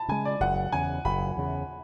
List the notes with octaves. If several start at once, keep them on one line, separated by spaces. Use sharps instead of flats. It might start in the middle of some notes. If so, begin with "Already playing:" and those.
Already playing: A5 B5
C#3 G#3 G#5
D5
F#1 F#5
E2 C#3 G#5
F#1 B5
E2 C#3